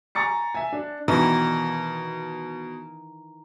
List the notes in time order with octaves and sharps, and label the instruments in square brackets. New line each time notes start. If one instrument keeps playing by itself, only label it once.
[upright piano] G#5 A#5 C#6 A6 C#7
E5 G#5
D4
[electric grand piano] B2 [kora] D#3 E3 D4 [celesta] A#5